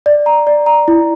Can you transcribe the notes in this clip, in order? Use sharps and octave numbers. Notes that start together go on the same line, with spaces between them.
D5
A#5
D5
A#5
E4